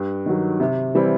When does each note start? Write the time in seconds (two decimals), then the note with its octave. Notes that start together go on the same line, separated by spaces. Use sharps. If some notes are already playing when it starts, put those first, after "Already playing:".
Already playing: G2
0.26 D#3 F#3
0.60 C3
0.95 E3 G3 C4 E4